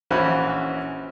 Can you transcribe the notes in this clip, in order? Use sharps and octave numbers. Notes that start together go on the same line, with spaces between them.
A#1 E3 C#4 F#4 C5 B5